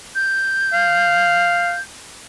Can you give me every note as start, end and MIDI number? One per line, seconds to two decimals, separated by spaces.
0.15 1.82 91
0.73 1.74 77